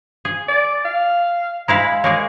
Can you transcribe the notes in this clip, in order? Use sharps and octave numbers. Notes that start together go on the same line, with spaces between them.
G#4
D5
F5
G#3 E4 F5 B5
G#3 A#3 G#4 C#5